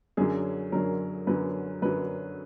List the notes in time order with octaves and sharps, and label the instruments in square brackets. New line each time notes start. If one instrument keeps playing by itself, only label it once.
[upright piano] F#2 D3 F#3 G#4
F#2 D3 F#3 A#4
F#2 D3 F#3 B4
F#2 D3 F#3 B4